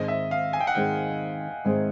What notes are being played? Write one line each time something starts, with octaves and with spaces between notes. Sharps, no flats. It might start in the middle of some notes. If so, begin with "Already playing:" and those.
Already playing: G#2 D#3 G#3 C4 D#4 D#5
E5
F5
G#5
G5
F#5
G#2 D#3 G#3 C4 D#4 G5
G#2 D#3 G#3 C4 D#4